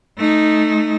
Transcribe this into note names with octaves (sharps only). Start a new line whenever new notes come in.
A3 D#4